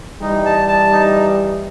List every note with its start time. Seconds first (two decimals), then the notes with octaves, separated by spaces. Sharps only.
0.21 E3 G3 D#4
0.45 A5
0.68 A5
0.92 D#4